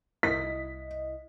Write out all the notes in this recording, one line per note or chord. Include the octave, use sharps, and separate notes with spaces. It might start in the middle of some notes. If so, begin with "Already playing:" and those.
C2 E4 D#5 B6